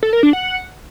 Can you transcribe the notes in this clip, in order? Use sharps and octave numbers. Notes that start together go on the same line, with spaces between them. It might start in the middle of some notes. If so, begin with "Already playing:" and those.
A4
A#4
D4
F#5